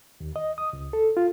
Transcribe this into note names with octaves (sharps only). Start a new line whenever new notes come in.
D#2
D#5
D#6
C#2
A4
F4